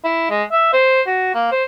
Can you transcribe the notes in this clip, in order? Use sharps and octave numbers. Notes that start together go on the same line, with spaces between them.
E4
G#3
E5
C5
F#4
A#3
C5